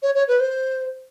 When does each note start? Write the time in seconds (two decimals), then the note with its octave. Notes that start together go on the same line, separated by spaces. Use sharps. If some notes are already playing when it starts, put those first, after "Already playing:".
0.02 C#5
0.15 C#5
0.28 B4
0.40 C5